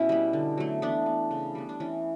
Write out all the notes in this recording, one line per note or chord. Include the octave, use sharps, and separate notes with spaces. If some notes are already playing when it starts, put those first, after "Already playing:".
Already playing: B2 C#4 E4
G3 B3
D3
F#3 A3
E3 B3 D4
B3
C#3
G3 B3
D4
E3 C#4